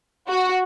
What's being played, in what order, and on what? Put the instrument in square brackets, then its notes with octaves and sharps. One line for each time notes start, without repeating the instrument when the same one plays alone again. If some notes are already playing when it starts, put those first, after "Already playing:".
[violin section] F#4